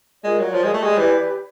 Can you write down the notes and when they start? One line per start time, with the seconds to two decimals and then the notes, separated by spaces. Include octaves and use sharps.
0.24 G#3 F4 A#4 D5
0.39 F#3
0.54 F3
0.64 G#3
0.74 A3
0.83 G#3 G4 B4 D5
0.98 E3